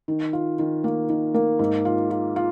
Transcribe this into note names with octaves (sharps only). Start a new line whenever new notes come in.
D#3
F4
D#3
A#3
D#3
A#3
G#2
F4
F4
F4